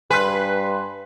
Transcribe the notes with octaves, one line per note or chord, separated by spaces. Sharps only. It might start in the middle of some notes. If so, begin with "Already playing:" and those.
G2 B4 G#5 C6 F#6